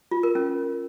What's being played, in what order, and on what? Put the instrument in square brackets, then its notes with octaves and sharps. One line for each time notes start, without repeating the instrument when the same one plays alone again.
[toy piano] F4
A#4
C#4